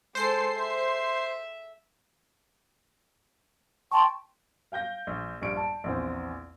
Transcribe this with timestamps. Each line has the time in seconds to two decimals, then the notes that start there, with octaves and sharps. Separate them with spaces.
0.15 G#3 A4 C5 C7
0.56 E5
3.91 G5 A5 C6 C#6
4.72 F5 G5 G6 A#6
5.07 A#1
5.42 A#1 G2 C#6 D7
5.57 A5
5.84 A#1 E2 C4